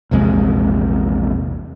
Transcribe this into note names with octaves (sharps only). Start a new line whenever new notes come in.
A#1 E2 C3 G#3